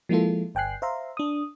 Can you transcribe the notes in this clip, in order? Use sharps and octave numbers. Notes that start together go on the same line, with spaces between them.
F3 G#3 A#3 E4 F4 A4
G1 G5 G#5 F#6 C7
C5 E5 F5 A#5 C6
D4 D#6